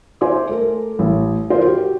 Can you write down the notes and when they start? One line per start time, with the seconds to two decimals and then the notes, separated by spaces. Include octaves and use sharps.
0.21 C5 E5 G#5 C6 D6
0.49 A3 A#4
0.99 A1
1.50 F4 A#4 C5
1.64 F#4 G4